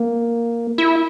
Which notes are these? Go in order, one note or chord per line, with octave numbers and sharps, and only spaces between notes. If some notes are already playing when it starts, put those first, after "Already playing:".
Already playing: A#3
E4